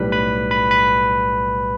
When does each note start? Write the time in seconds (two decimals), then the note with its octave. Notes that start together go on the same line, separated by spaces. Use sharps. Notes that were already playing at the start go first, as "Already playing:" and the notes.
Already playing: B1 A2 G3 B4 B5
0.12 B4 B5
0.51 B4 B5
0.71 B4 B5